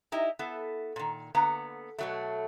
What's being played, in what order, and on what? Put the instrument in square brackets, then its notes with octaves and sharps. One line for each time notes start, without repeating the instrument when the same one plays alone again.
[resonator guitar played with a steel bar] D#4 E4 G4 D#5
B3 E4 A4
A#2 D#3
D3 A#3 B3 A#5
B2 F#3 A3